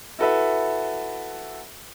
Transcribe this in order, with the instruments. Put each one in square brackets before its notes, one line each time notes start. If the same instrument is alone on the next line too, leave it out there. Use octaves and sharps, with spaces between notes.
[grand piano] E4 F#4 A4 B4 E5